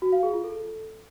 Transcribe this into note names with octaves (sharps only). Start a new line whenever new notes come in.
F#4
F5
G#4
F4
A4